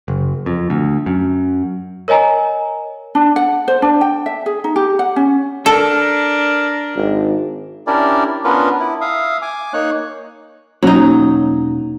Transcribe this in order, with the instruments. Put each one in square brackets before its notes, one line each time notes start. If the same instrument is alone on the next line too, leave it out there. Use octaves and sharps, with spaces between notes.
[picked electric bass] F#1
F2
D2
F#2
[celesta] A#4 C#5 D#5 G#5 A#5
[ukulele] D4
F#5
C5
D4
G5
E5
G#4
D#4
G4
F#5
C#4
[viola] D4 [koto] A4 [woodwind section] A#4
[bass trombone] G#1
[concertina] C#4 D4 E4 G4 A#4 D5
B3 C#4 D4 F4 A#4 B4
E4
E5 F5 D#6
G#5 D6
A#3 D#4 C#5 F#6
[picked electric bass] E1 A#3 C#4 [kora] F#3 D#4